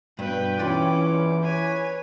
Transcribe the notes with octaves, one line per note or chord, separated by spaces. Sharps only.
G2 B2 B4 G5
E3 C#4 F4 G5 B5 D6
B4 C#5 G#5